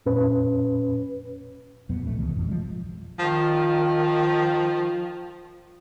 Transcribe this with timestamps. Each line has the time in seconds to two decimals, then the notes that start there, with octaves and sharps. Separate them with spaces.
0.06 F2 A#2 C#4 B4
1.89 D#1 F2 B2 B3
2.06 A1 A3
2.18 C#2 B2 E3
2.35 A1 F2 A#2
2.47 F3 G#3
3.19 D#3 F3